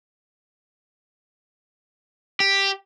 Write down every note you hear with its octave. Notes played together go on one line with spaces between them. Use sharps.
G4